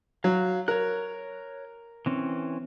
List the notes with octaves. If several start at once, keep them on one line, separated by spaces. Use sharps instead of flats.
F#3 F5
A#4 C#5 F#6
E3 C4 C#4